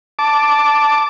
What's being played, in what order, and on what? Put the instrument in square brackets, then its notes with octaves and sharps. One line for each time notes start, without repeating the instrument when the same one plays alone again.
[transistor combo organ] A5 D6